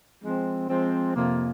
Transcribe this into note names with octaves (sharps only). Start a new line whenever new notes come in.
F3 G#3 C4
F3 G#3 C4
F2 C3 F3 A#3